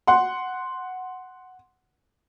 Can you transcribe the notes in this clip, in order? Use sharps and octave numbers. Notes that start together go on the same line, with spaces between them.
F#5 C6